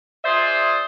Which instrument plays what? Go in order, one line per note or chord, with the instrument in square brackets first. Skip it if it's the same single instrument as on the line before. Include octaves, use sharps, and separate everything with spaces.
[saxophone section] F4 G#4 C5 D5 E5